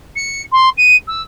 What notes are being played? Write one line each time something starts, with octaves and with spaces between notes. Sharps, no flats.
C#7
C6
D#7
E6